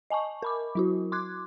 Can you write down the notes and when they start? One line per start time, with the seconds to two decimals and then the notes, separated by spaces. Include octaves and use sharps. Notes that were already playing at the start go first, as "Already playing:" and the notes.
0.10 D#5 G#5 A5 C#6
0.42 A#4 B5 D6
0.75 F#3 E4 F#4
1.12 C6 D6 F#6 G#6